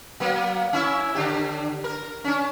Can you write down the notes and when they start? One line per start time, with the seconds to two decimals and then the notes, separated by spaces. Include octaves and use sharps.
0.20 F#3 A#3 B3
0.73 C#4 E4 E5
1.15 D3 D4 G4
1.84 A#4
2.24 C#4 D4